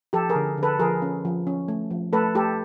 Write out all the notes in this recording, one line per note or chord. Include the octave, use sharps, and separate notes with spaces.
F3 G4 A4
G#4 A#4
D3
D3
A4 B4
F3 G#4 A#4
C#4
F3
C#4
A3
F3
A3 A4 B4
A3 G4 A4